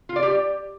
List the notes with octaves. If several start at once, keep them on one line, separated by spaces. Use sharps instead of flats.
F4
D5
G4